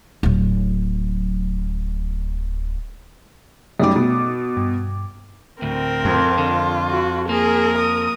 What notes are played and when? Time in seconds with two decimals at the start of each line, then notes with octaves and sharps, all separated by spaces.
0.23 D1 F#3
3.80 F#2 G3 A3 D#4 D6
3.96 B2
4.57 G2
5.62 D2 A2 C4 A#4
6.05 F2 F4
6.38 D3
6.90 F#4
7.29 A#3 G#4 A#4
7.78 D#6